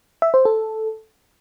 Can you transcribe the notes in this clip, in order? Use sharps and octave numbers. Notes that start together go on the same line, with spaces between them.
E5
C5
A4